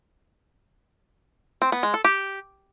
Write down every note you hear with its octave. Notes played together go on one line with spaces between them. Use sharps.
C4
B3
G#3
A4
G4